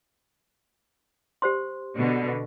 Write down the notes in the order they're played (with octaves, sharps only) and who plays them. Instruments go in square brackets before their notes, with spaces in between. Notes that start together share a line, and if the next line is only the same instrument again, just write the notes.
[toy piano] G4 C5 C6
[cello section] B2 D3